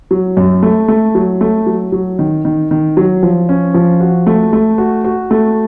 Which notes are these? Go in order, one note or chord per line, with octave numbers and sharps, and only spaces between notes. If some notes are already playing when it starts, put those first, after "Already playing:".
F#3
F#2
A3
A3
F#3
A3
F#3
F#3
D#3
D#3
D#3
F#3
F3
C#4
F3
F#4
A3
A3
F#4
F#4
A3